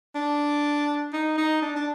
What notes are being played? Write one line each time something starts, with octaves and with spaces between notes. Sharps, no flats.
D4
D#4
D#4
D4
D4